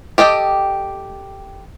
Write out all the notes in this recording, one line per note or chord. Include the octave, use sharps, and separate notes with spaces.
G4 A4 D#5 G5